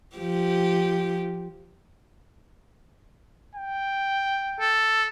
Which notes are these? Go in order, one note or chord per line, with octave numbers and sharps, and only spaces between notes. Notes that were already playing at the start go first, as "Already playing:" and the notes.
F3 G4
G5
A4